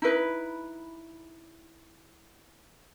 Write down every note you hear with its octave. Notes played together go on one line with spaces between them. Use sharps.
D#4 E4 B4